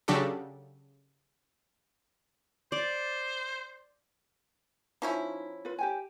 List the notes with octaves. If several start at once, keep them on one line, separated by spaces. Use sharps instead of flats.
C#3 F#3 D4 F#4 G4 A4
C5 D5
F3 C#4 D#4 E4
F4 B4
G4 G5 G#5